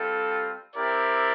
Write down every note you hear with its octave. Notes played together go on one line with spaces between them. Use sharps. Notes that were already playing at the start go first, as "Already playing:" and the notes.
Already playing: G3 C4 F4 A4
C4 E4 G4 A#4 D5